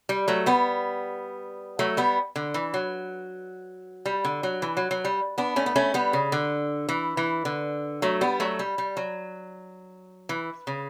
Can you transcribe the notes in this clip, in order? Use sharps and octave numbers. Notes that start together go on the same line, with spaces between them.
G3
F#3 A3
G3 B3
F#3 A3
G3 B3
D3
E3
F#3
G3
D3
F#3
E3
F#3
F#3
G3
B3 D4
A3 C#4
B3
A3 C#4
G3 B3
C#3
D3
E3
E3
D3
F#3 A3
G3 B3
F#3 A3
G3
G3
F#3
E3
C#3